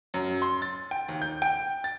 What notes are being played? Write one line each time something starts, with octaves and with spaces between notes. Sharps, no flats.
F#2
C6
A6
G5
D#2
G6
G5
A6